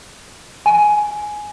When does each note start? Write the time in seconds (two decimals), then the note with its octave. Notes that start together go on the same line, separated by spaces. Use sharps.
0.66 G#5